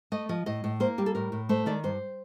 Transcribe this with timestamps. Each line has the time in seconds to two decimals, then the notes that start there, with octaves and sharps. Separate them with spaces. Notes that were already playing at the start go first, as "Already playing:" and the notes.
0.12 A3 D#5
0.29 F3 D#5
0.46 A2 D#5
0.64 A2
0.80 A#3 C5
0.98 G3 G4
1.06 A4
1.15 A2 A#4
1.32 A2
1.49 A3 C5
1.66 D#3 D5
1.84 G2 C5